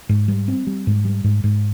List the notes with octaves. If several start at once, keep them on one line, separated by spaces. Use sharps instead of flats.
G#2
G3
C4
G3
G#2
G3
G#2
G#2